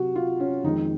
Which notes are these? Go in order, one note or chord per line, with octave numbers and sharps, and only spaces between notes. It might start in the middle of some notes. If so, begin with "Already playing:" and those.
Already playing: C3 F#3 F#4
F4
C#4
F2 D#3 G#3 D#4